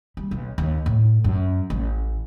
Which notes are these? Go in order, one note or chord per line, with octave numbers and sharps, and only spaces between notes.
G3
B1
D#2
A2
F#2
A1